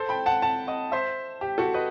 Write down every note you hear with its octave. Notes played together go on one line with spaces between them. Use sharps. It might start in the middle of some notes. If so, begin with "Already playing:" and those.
Already playing: A4 C5
G5 B5
F#5 A5
F#5 A5
D#5 F#5
C5 E5
G4
F#4 A4
B4 D#5